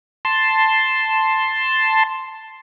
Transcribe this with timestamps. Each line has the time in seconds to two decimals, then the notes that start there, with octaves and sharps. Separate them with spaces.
0.25 A5 C6